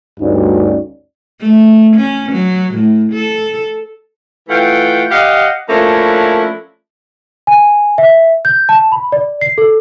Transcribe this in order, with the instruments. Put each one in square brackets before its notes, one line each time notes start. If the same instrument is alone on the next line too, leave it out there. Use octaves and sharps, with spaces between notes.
[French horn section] D2 G2 C#4 D#4 F#4 D5
[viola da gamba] A3
C#4
F#3
A2
A4
[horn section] E3 A3 F4 F#5 G5
G4 D#5 F5 F#5
F3 A3 A#3 C#4 D4 E4
[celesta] G#5
E5
G6
A5
B5
D5
C7
A4